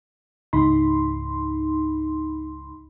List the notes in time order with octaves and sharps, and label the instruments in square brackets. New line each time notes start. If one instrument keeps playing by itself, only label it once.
[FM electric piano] C#2 G#2 D#4 B5 C6